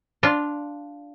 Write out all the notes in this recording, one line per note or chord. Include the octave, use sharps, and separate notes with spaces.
D4 F4